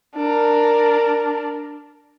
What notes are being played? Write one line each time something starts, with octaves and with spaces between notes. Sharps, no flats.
D4 A#4